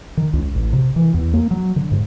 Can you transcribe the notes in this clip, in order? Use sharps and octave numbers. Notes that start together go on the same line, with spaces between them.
D#3
C#2
A1
C3
E3
E2
A#3
F#3
D3
G#2